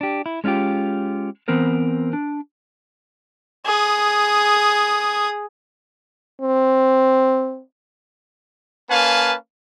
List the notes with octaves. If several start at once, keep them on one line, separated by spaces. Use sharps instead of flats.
D4 G4
E4
G#3 C#4 D4 F4 G4
E3 B3 C4 A#4 C5
D4
G#4 D#6
C4
A#3 C#4 B4 F5 G#5 A5